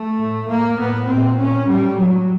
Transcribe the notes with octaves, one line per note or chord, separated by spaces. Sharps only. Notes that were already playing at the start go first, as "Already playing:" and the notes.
Already playing: A3
A2
A2 A#3
A2 B3
A#2 C4
A#2 C#4
A2 G3
A2 F#3